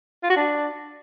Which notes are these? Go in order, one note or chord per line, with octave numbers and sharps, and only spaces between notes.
F4
F#4
D4